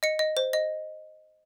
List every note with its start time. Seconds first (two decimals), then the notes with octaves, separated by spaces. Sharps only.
0.03 D#5 C#7
0.19 D#5
0.37 C5
0.53 D#5